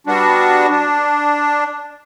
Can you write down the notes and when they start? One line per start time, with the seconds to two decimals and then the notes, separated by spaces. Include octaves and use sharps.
0.07 G3 B3 D4 F#4
0.69 D4